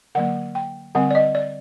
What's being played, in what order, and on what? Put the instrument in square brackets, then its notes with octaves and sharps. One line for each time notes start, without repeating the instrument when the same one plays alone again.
[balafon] D3 F#3 A#3 F#5
G5
D3 G3 C4 F#5
D5
D#5
D5